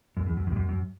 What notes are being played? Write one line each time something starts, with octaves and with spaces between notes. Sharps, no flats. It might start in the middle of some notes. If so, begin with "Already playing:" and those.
F#2
E2
F#2
E2
G2
F#2
F#2